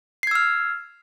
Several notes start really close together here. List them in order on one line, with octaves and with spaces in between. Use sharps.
C7 G#6 E6 F6